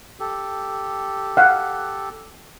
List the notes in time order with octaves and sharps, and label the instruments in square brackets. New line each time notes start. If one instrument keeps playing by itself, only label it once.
[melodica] G4 A4
[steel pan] F5 F#5